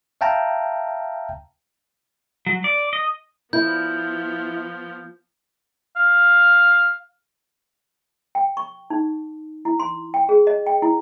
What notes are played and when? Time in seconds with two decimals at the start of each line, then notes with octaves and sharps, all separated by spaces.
0.21 E5 F5 G5 A5 A#5
2.46 F#3
2.64 D5
2.93 D#5
3.53 F3 B3 E4 G6
5.96 F5
8.35 G5
8.57 C#6
8.90 D#4
9.65 E4
9.80 C6
10.14 G5
10.29 G#4
10.47 D#5
10.67 G5
10.82 E4